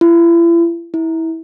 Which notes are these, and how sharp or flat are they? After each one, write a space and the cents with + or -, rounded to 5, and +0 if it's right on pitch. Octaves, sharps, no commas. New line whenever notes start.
E4 +40
E4 -25